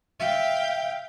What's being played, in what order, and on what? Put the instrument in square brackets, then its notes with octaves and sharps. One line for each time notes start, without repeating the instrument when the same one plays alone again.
[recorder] E5 [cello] F5 G5